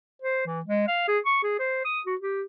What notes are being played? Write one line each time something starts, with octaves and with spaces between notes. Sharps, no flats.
C5
E3
G#3
F5
G#4
C#6
G#4
C5
D#6
F#4
G4